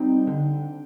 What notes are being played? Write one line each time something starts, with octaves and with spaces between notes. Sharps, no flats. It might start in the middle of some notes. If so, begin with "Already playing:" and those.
Already playing: G3 C4 D#4 G5
D3